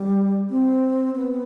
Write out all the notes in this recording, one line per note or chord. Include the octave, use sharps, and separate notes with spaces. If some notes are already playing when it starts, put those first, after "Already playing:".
Already playing: G3
C4
B3